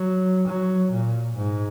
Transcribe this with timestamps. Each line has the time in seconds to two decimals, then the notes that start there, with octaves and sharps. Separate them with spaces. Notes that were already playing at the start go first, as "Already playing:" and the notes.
Already playing: F#3
0.46 F#3
0.91 A#2
1.36 G#2